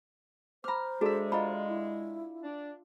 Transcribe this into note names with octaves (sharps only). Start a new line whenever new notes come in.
C5 A#5 B5 D6 F6
G#3 D4 F#4 G#4 A4 E5
F4 D#5 A#5 B5
E4
D4 D5